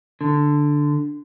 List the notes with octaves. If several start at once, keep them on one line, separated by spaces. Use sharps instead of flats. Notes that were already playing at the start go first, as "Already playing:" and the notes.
D3